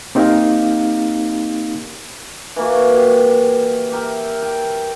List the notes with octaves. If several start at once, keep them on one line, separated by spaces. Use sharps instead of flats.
A#3 C4 D#4 G4 A#4 F5
E3 A#3 F#4
G4
G4 A#4 E5
G5